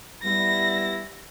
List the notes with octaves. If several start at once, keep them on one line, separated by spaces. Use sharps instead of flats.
G3 B3 E4 A#6